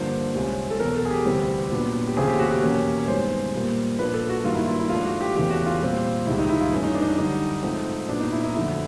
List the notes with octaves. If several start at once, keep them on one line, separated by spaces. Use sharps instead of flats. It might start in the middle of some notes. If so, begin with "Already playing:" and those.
Already playing: G2 D3 F3 A#3 D4 C5
C2 C3 F3 G#3 C#4
A4
E2 B2 F#3 A#4
A4
G#4
G4
D2 C3 E3 G3 C4
A#2 F#3 B3 D4
G4
D#2 C#3 F3 A3 C4 G#4
G4
F#4
G4
E2 B2 F#3 A#3 C#4
C#5
G2 D#3 G#3 B3 C5
A#2 G3 A#3
A#2 F3 A#3 D4 B4
A4
F#4
G2 D#3 F#3 A#3 F4
E4
F4
E4
G#2 F3 A3 D4 F4
F#4
G4
E2 C#3 E3 A3 G4
F#4
F4
A#2 G3 C4
C#2 C3 D#3 G3 E4
D#4
E4
F4
G2 E3 A3 C#4
D#4
D4
D#4
D4
F#2 D3 G3 D#4
G#2 F3 A3 C4
A#2 F#3 B3 D4
D#4
E4
D#4
F2 D3 F#3 A3 D4 E4